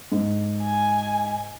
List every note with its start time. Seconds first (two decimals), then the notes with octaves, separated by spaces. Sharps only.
0.12 G#2
0.63 G#5